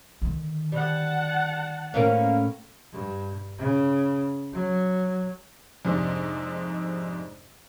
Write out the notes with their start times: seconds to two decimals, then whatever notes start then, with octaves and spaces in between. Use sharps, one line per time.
0.22 D3 D#3
0.72 G3 F#5 A5
1.94 A2 A#3 C#4 A#4
2.92 G2
3.58 C#3
4.54 F#3
5.85 F2 G#2 C3 D4